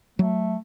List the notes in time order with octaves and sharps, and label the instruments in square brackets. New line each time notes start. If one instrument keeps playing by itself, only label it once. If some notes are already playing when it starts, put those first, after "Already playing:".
[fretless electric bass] F#3 [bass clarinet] A3